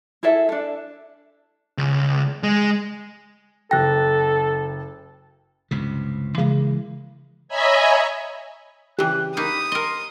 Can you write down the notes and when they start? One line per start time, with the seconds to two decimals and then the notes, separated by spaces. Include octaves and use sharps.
0.23 E4 G#4 A4 E5
0.49 D4 A4
1.78 C#2
2.43 G#3
3.71 F#1 A4 G5 F#6 A#6
5.71 C#2 G2 C3
6.38 C#3 E3 G#3 A#3
7.48 C#5 D#5 E5 G#5 A#5 B5
8.99 C#3 E3 G4 F#6
9.37 A#3 D#4 B5 D#6
9.72 A#4 D#5 C6